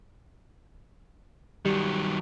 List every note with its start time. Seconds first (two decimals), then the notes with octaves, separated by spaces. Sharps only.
1.65 D#3 F#3 G3